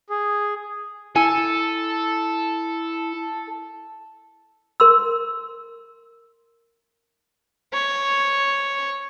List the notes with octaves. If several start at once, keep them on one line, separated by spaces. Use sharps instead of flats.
G#4
E4 A4 G#5
A#4 C6 E6
C#5